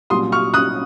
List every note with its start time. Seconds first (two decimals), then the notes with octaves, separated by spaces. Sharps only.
0.10 C2 A#2 F#3 C#4 C6 D#6
0.32 C#6 F6
0.54 D#6 F#6